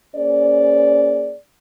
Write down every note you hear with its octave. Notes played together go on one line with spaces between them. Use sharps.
A#3 C#4 G#4 C5 D5